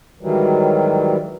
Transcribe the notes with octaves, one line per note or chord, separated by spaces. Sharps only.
G#2 D#3 E3 F#3 G3